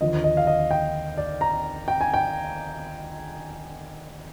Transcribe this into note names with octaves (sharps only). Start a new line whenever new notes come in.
D#2 D3 F3 D#5
D#5
F5
D#5
G5
D5
A#5
G5
G#5
G5